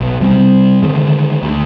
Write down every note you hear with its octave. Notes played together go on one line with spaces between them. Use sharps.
B1
C3 G3 B3 C4
D3 D#3 G#3
D2